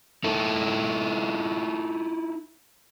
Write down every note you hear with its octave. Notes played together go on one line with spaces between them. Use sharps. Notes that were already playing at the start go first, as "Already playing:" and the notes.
D#4 E4 A4